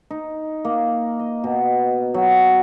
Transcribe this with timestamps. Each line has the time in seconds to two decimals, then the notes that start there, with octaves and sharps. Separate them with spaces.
0.11 D#4
0.65 A#3
1.20 D#5
1.44 B2
2.14 F#3